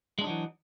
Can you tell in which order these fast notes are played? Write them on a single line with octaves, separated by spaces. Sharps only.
G#3 D4 D#4 F#3 E3